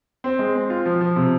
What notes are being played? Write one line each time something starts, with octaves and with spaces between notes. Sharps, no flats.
C4
G#3
C4
F4
F3
F3
C3